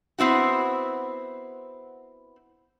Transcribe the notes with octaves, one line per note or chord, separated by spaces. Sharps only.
B3 C4 E4 F#4